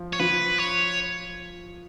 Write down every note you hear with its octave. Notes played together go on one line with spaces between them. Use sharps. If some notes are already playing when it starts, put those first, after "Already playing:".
Already playing: F3
C#5
F3 B4
C#5